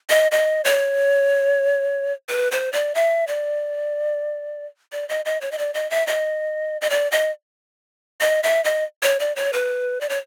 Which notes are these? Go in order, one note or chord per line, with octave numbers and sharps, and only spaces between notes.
D#5
D#5
C#5
B4
C5
D5
E5
D5
D5
D#5
D#5
C#5
D#5
D5
D#5
E5
D#5
D#5
D5
D#5
D#5
E5
D#5
C#5
D5
C#5
B4
D5
C#5